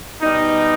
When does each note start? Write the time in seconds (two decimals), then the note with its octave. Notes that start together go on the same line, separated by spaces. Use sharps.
0.22 B2 G3 D#4